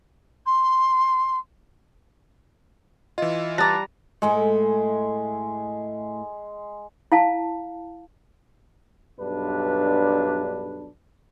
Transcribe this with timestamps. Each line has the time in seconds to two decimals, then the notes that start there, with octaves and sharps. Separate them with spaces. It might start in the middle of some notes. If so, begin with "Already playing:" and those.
0.46 C6
3.18 E3 F4 D#5
3.58 G3 A5 A#5 D6 F#6 A6
4.22 A2 G#3 A3 E4
7.12 E4 F5 A5
9.20 B1 G2 D4 B4